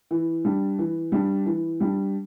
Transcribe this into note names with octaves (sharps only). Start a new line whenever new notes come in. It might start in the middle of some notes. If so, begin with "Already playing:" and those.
E3
G3 D4
E3
G3 D4
E3
G3 D4